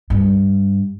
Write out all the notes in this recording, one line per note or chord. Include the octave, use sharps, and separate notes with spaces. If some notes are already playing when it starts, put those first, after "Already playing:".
G2